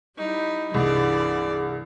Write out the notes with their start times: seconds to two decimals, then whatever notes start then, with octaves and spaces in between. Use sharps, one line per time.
0.18 G3 D#4 E4
0.74 C2 G2 E3 G#4 D5